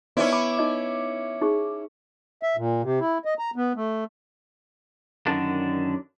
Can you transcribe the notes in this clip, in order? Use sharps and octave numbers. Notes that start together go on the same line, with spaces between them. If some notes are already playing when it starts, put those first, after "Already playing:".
B3 C#4 D#4 E4 C5 D5
B5 D6
D#4 D#5
D#4 G#4 C#6
E5
A#2
C3
E4
D#5
A#5
B3
A3
F#2 D3 D#3 D4